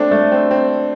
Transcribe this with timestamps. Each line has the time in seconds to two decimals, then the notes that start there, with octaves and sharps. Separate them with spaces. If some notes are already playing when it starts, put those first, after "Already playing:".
Already playing: A3 C4 D4
0.11 A3
0.32 C4
0.51 C4